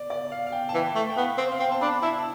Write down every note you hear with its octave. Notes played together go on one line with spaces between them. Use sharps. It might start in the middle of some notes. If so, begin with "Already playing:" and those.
Already playing: D5
D5
F5
F5
G5
A5
E3 G5
A3
G5
B3 F5
C4
F5
C4 G5
A5
D4 B5
E4 A5